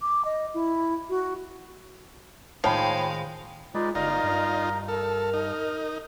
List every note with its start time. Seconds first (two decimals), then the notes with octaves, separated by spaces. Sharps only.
0.02 D6
0.25 D#5
0.54 E4
1.09 F#4
2.64 A2 D#3 F3 G#3 C#5 F5 G5 B5
3.75 G#3 D#4 F4 B4 D5
3.95 G1 D#4 F4 A#4 D5 A#5
4.24 G2
4.88 A4 A#4 F6
5.33 D#4